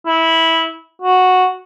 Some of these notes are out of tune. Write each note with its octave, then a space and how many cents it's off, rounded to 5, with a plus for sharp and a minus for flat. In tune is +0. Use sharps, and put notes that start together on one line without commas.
E4 -15
F#4 -5